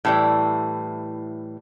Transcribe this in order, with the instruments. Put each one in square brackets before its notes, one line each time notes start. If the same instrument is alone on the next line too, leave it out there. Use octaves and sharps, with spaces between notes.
[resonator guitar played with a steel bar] A2 E3 G3